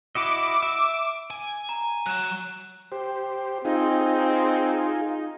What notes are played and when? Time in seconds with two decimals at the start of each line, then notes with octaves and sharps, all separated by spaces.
0.15 E4 F#4 D#5 D6
0.63 E5
1.30 G#5
1.69 A#5
2.06 F#3 F#6 E7
2.92 G4 C5
3.65 C4 D#4 F4 G#4